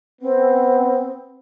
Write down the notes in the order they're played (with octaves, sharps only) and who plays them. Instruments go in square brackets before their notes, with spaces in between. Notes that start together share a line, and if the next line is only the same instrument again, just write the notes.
[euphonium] B3 [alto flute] C4